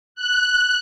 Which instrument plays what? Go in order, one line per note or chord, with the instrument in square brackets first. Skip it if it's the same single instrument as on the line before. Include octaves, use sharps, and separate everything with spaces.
[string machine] F#6